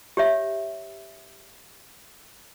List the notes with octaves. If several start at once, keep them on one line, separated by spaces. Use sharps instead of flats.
G4 C#5 E5